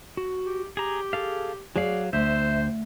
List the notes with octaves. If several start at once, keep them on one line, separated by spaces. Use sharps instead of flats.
F#4
G4
G4 G#4 A#5
G#4 A4 F5
F#3 G#4 D5 F5
D2 C5 E5